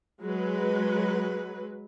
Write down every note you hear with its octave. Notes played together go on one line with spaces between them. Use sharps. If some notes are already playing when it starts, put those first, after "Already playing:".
F#3 G#3 B4